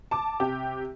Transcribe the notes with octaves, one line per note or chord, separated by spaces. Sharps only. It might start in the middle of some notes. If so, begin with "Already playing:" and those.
A5 D6
C3 G4